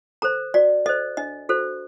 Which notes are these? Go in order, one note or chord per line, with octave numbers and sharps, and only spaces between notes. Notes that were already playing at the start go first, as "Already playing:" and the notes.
A4 C5 A#5
F#4 D5
A4 C5 D#5
D4 D#5
F#4 A4 C5